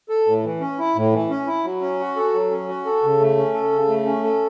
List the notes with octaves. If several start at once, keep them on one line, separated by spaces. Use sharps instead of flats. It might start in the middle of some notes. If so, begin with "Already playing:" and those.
A4
A2
E3
C#4
E4
A2
E3
C#4
E4
F#3
C#4
F#4
A4
F#3
C#4
F#4
A4
C#3
A3
C#4
A4
C#3
A3
C#4
A4